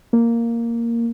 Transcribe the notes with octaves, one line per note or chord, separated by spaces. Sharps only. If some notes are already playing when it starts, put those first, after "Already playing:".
A#3